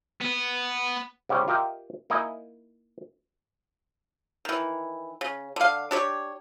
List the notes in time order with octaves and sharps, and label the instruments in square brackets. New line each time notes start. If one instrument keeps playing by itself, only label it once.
[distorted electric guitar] B3
[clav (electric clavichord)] G#2 C#3 G3 C4 C#4
F4 G4 A#4 D#5 E5 G5
A#3 D#4 E4 D#5 G#5
[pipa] D#3 E3
C#3
D3 F5
D4 G4 C#5